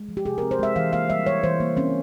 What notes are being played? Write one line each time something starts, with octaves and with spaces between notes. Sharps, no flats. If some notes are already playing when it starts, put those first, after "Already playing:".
Already playing: G#3
F3
G4
C3 G#4
C4 A#4
C5
G#3 E5
E3 F5
A#3 F5
G3 E5
E3 C#5
E3 C5
A#3
C4 C#4